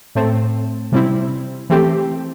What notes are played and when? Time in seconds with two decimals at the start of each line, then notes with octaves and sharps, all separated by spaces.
0.15 A2 A3 C4
0.92 C3 G3 C4 E4
1.70 E3 A3 C4 G4